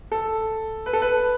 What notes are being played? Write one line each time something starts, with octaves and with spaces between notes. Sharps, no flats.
A4
B4
A4
B4